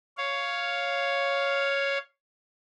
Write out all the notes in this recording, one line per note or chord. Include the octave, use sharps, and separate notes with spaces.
C#5 F5